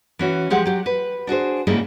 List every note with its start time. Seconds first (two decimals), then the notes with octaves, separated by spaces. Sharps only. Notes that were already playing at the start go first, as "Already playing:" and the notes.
0.19 E3 C#4 F#4
0.50 F3 G#3 G4 F#5
0.65 F#3 G4
0.86 B4
1.27 D4 F#4 G#4 C5
1.67 G#2 C#3 G3 G#3 A#3 E4